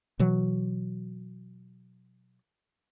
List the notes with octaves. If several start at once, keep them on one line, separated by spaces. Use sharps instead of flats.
B2 E3 F#3